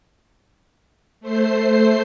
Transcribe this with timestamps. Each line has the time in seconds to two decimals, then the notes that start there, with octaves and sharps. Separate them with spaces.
1.21 A3 C5 C7